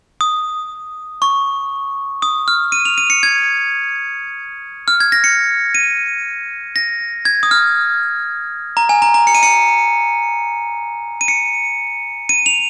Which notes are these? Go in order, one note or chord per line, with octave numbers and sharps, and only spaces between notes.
D#6
C#6
D#6
F6
D#7
F7
D#7
C#7
G#6
F6
G#6
A#6
C#7
D#7
A#6
G#6
D#6
F6
A#5
G#5
A#5
A#5
C#7
D#7
C#7
D#7
C#7
D#7
F7